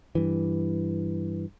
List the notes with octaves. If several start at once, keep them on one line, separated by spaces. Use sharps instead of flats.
G2 E3